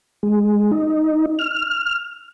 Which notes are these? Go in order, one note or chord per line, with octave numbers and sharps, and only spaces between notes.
G#3
D#4
F6